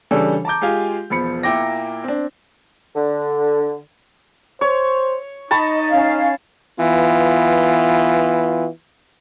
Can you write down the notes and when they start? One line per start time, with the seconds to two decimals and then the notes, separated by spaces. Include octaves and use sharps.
0.11 C#3 E3 G3 D4 A4 C#5
0.45 A5 A#5 D6 G6
0.61 G#3 F4 G4 F5 G#5
1.10 E1 F3 B5 C#7
1.43 A#2 A#3 E4 G5 D6 A#6
2.04 C4 D4
2.95 D3
4.61 C5 C#5
5.51 D#4 D#5 A5 B5 C#6
5.90 C#4 F5
6.78 E3 B3 F4